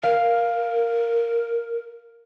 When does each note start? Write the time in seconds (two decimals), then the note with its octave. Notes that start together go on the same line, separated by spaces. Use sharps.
0.03 A#4 F5